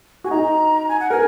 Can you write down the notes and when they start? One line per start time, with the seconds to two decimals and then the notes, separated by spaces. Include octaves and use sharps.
0.24 F#4 G#5
0.31 D#4 A#5
0.89 G#5
1.00 F#5
1.10 A#4 G#5